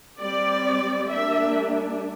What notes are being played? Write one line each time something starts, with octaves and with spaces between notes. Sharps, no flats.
G3 C4 D5
G3 A#3 D4 E5